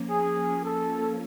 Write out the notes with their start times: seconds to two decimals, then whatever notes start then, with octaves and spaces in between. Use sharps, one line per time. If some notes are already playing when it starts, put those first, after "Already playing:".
Already playing: F3 A#3 C#4
0.09 G#4
0.64 A4